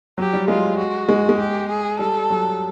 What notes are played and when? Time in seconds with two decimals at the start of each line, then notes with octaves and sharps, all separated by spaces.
0.18 F#3 G4
0.33 G3
0.48 G#3 F4
0.78 F#4
1.09 G#3
1.29 G#3
1.40 G4
1.69 G#4
1.99 G3 A4
2.30 F#3